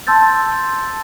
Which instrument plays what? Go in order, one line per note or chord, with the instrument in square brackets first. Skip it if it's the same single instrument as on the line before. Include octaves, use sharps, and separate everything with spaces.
[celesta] A5 C6 E6 G6 A6